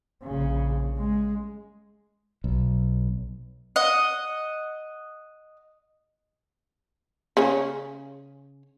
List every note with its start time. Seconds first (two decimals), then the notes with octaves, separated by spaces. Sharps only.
0.24 A#1 C#3
0.97 G#3
2.44 B1
3.76 D#5 F#5
7.37 C#3 C#4